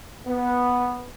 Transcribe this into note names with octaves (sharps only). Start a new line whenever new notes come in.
B3